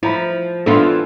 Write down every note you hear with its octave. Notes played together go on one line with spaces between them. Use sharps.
F3 E4 A#5 B5
E3 B3 D4 F4 A4